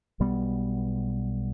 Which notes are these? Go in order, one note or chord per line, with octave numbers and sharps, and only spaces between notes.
B1 B2 G3 B3